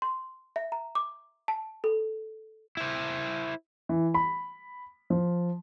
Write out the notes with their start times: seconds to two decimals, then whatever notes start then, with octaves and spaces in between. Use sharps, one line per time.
0.02 C6
0.56 E5
0.72 A#5
0.95 D6
1.48 A5
1.84 A4
2.77 E4 C5
3.89 E3
4.14 B5
5.10 F3